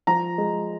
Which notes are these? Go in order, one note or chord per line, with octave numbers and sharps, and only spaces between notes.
F3 A#5
G#3